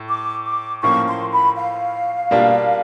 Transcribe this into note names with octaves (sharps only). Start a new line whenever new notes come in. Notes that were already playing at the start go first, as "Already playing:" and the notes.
Already playing: A2
D6
D6
A2 F3 A#3 C#4 C#6
C6
B5
F5
B2 G3 A#3 D4 F4